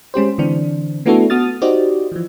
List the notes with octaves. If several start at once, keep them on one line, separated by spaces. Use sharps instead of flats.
G#3 C#4 G4 C5
D3 E3 C4 D4
A3 B3 D4 E4 F#4 A4
B3 F#4 D#6 F6 A6
D#4 F#4 G4 C5 D5 D#5
E3 F3